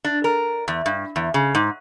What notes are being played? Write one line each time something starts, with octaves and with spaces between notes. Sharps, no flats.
D4
A#4
E2
G2
E2
C#3
G#2